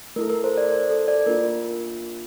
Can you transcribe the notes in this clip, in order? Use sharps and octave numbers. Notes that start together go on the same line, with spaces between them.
A3 E4 A4 A#4
A#4
C5
D5
C5
A4
D5
A#3 D4 F4 A#4